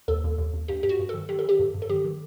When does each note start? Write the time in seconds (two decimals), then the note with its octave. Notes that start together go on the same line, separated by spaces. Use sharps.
0.08 D#2 A4
0.24 D#2
0.38 D#2
0.53 D#2
0.68 G2 G4
0.83 G2 G4
0.89 F#4
0.99 G2
1.09 A4
1.14 D#3
1.29 D#3 G4
1.39 A4
1.44 D#3 G4
1.59 G2
1.74 G2
1.82 A4
1.90 D#3 G4
2.04 D#3